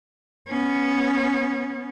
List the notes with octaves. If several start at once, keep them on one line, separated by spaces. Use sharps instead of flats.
B3 C#4